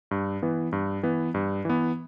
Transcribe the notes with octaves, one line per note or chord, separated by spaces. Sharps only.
G2
E3 B3
G2
E3 B3
G2
E3 B3